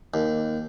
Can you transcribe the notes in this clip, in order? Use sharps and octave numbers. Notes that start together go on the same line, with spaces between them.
D#2